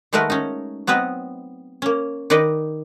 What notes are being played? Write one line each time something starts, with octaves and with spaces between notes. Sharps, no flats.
D#3 G#3 A3 F#4 A#4 B4
C#4 D#4
F#3 B3 C4 B4 D#5
A#3 C#4
D#3 D#4 B4 D5 D#5